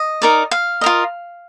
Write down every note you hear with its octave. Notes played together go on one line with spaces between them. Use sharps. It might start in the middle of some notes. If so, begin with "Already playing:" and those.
Already playing: D#5
D#4 A#4 D5
F5
F4 A#4 D#5